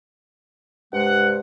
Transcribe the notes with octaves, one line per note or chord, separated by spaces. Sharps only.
G2 C3 G#3 F#5